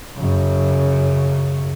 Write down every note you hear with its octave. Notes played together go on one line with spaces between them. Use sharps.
F#2 C#3